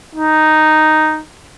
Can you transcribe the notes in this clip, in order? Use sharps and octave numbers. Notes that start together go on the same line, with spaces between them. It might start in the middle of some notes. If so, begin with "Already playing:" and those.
D#4